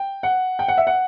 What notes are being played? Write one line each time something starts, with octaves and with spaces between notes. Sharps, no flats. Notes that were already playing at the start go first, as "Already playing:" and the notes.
Already playing: G5
F#5
G5
F#5
E5
F#5